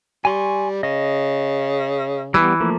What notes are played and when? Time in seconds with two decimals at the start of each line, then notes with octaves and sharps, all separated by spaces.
0.25 G3 G#5 C6 C#6
0.83 C#3 D#5
2.34 E3 G3 B3
2.60 F3 A3 A#3